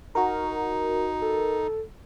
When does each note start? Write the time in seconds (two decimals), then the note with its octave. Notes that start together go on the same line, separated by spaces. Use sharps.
0.15 D#4 F#4 A#4
1.22 A4